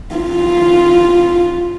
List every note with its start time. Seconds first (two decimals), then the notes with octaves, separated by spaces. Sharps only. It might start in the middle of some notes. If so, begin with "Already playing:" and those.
0.16 F4